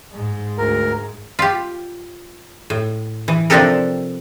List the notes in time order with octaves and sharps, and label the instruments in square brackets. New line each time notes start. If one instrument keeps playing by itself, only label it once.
[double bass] G#2 G#3
[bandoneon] D2 A#4
[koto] F4 G4
A2
E3
C3 F3 D4 G4 A4 A#4